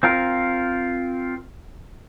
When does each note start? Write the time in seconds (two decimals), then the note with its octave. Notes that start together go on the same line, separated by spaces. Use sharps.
0.03 C4 F4 A#4